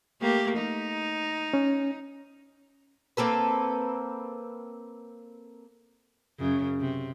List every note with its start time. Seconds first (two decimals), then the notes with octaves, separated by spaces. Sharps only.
0.21 A3 A#3 G4
0.57 D#4
1.54 C#4
3.17 A#3 C4 A4 B4
6.39 F#2 C#3
6.80 C3